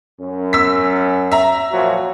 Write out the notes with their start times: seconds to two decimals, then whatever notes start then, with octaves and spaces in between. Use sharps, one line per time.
0.21 F#2 C#4
0.53 E6 B6
1.32 E5 A#5
1.72 A#2 F3 F#3